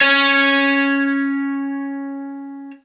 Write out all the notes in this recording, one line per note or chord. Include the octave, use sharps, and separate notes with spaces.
C#4 C#5